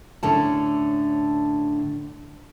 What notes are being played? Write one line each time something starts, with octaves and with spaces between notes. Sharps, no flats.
A2 D3 C#4 A5